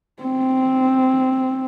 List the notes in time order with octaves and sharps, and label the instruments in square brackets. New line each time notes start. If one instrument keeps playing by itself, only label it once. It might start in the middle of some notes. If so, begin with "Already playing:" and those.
[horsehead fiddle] C4